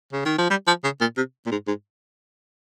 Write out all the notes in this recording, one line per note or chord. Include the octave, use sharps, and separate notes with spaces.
C#3
D#3
F3
G3
F3
C#3
A#2
C3
A#2
G#2
G#2